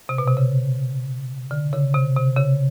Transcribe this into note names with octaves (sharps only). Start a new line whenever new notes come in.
C3
B2
C3
C#3
D3
C#3
C3
C3
C#3